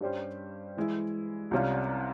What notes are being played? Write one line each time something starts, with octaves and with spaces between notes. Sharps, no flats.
G2 G3 C#4 G4 C5
E3 G#3 E4
C2 C3 G3 C#4 F4